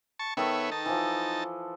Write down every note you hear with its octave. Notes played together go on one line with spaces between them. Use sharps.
A5 C#6
D#3 B3 A4 B4 C#5 E5
D#4 A5
E3 F3